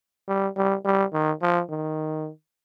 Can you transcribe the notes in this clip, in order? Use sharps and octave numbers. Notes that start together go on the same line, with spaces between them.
G3
G3
G3
D#3
F3
D#3